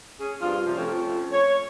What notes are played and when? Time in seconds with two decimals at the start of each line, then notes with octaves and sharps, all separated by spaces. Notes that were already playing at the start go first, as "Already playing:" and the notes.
0.20 C#4 G#4
0.41 G2 C4 D4 F4
0.65 C3 F3
0.77 F3 A3 C4 C#4 C#5
1.32 C#5